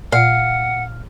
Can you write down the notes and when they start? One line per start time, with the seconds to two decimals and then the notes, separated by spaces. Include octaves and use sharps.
0.12 A#2 F5 F#5